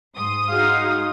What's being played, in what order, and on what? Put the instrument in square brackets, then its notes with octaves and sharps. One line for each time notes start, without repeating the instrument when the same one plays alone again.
[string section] G#2 C6 D#6
[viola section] D#4 F#4 G#4 [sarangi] F5